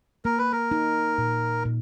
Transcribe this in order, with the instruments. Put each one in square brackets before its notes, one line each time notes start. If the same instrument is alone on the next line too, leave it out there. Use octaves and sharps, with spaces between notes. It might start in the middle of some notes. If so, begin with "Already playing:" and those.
[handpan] A#3 [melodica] A#4
[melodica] B4
A#4
[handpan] D#4
A#2
A#2